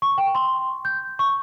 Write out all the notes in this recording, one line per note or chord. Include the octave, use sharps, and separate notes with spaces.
C#6
G5
C6
G6
C#6